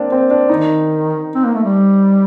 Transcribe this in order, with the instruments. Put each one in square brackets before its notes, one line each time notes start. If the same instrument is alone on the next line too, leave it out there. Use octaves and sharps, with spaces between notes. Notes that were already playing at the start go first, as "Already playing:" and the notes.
Already playing: [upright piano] A#3 C4 D4
C4
D4
[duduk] D#3 [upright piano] D#4
[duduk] C4
A#3
A3
G3